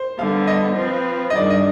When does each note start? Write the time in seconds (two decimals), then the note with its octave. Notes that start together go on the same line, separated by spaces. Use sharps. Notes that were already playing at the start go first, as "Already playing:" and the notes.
Already playing: C5
0.18 D3 G3 B3 F5
0.47 D#5
0.77 F3 C4 F4 B4
1.30 D#5
1.35 G2 D#3 G3 D4 G#4 D5
1.50 D#5